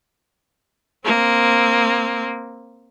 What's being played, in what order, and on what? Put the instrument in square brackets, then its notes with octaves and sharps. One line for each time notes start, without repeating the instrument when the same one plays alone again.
[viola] A#3 C4